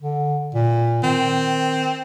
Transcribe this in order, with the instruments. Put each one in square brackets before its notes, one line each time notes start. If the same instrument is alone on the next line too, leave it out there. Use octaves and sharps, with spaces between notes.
[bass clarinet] D3
A#2
[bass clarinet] D#3 [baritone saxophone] C4